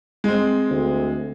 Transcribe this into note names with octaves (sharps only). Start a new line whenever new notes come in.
G#3 C4
D2